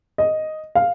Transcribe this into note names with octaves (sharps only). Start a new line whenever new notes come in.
D#5
F5